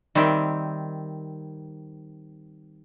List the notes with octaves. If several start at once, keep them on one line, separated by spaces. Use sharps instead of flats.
D#3 G3 C4 E5